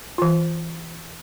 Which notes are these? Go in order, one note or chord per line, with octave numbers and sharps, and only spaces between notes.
E3 F4